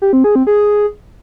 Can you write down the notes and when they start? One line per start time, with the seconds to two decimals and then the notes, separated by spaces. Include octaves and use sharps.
0.02 G4
0.13 C4
0.24 G#4
0.35 C4
0.47 G#4